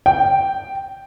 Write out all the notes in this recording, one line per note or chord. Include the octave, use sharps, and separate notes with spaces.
G5